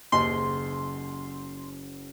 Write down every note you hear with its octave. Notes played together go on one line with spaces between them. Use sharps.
F#1 D#2 C6